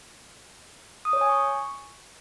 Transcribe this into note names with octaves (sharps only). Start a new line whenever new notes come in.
D#6
C#5
G#5
C#6